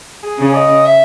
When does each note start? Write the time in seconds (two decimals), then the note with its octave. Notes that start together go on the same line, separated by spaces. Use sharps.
0.23 G#4
0.38 C#3
0.54 D#5
0.85 E5